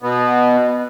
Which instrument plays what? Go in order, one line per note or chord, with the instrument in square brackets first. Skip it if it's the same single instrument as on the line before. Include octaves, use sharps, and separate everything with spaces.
[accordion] B2 B3